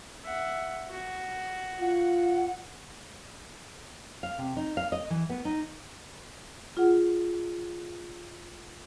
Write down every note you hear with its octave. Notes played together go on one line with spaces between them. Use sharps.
E5 F#5
F#4
F4 F#5
F5
C3
D#4
F5
D#5
E3
B3
D#4
F4 G#4 F#5